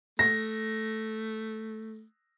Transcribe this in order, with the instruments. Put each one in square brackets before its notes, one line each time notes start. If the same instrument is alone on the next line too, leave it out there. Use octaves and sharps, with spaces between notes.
[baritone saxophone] A3 [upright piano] A#6